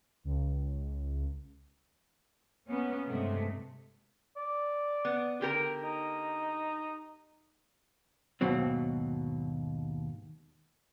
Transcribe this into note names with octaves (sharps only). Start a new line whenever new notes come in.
C#2
A#3 B3 C#4
G2 C3 G#3 A3
D5
B3
D3 G4 A#4
D#4
D#2 G#2 B2 F#3 C4